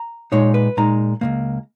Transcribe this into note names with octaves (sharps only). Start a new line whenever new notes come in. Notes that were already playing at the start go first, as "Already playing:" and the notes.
Already playing: A#5
A#2 G#3 D#4 C#5
B4
A#2 G#3 D#4 A#5
C#2 B2 A#3